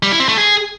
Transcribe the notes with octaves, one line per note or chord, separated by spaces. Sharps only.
G3
E4
C4
A3
G#4